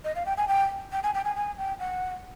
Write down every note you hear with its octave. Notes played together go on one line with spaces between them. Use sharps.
D#5
F5
G5
G#5
G5
G5
G#5
G5
G#5
G#5
G5
F#5